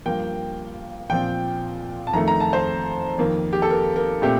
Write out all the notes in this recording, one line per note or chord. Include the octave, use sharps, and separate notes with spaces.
G2 F3 A#3 G5
A#2 F3 C4 G5
A5
F2 D#3 A3 A#5
A#5
A5
C5
F2 D#3 A#3
G4
A4
A#4
A#4
A#2 A3 C4 G4